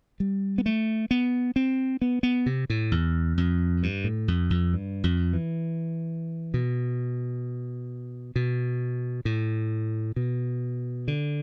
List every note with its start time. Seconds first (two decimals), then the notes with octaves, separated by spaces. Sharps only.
0.20 G3
0.58 B3
0.66 A3
1.11 B3
1.56 C4
2.02 B3
2.23 B3
2.46 C3
2.70 A2
2.92 E2
3.38 F2
3.83 G2
4.04 A2
4.28 F2
4.50 F2
4.73 G2
5.04 F2
5.33 E3
6.54 B2
8.36 B2
9.25 A2
10.16 B2
11.08 D3